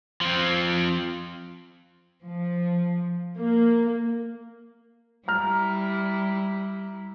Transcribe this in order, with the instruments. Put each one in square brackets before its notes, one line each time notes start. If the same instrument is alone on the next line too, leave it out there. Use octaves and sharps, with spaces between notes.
[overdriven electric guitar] F3 C4
[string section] F3
A#3
[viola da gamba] G3 E4 [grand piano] A#5 F6